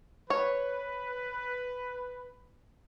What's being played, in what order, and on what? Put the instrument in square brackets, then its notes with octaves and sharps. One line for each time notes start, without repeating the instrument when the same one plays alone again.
[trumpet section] B4 [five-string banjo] C#5